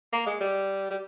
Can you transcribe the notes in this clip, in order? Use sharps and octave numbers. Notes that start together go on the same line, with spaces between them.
A#3
G#3
G3
G3